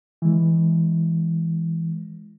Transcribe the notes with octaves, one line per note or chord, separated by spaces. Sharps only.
E3 G#3